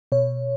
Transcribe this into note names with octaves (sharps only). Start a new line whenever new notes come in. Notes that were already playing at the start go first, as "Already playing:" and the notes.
B2 C#5